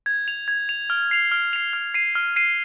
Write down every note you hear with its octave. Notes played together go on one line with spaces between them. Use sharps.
G#6
F7
G#6
F7
F6
C7 F7
F6
C7 F7
F6
C7 D#7
F6
C7 D#7